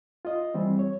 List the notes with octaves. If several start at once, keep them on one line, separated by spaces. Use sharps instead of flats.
F4 D#5
E3 G3 C4
C#5